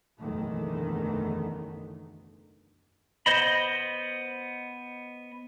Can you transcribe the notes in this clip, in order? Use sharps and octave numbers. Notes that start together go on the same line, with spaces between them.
F#1 B1 E2 D3 D#3 A3
B3 C5 D#5 B5